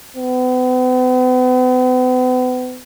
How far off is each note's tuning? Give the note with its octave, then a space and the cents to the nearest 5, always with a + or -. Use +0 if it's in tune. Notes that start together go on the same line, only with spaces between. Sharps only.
B3 +45